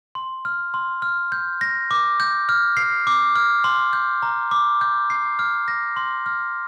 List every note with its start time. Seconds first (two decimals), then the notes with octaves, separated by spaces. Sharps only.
0.15 C6
0.45 F6
0.74 C6
1.02 F6
1.32 G6
1.61 A#6
1.91 D6
2.20 G6
2.49 F6
2.77 C7
3.07 D6
3.36 F6
3.64 C6
3.93 G6
4.23 A#5
4.51 D6
4.81 G6
5.10 C7
5.39 F6
5.68 A#6
5.96 C6
6.26 F6